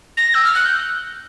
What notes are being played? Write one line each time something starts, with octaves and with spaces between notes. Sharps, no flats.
A#6
E6
F6
F#6
G6